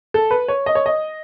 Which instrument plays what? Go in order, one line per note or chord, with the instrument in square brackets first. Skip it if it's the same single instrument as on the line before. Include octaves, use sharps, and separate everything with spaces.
[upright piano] A4
B4
C#5
D#5
C#5
D#5